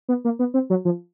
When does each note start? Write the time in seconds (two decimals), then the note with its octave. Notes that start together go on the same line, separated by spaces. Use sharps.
0.09 B3
0.25 A#3
0.39 B3
0.54 C4
0.70 F#3
0.85 F3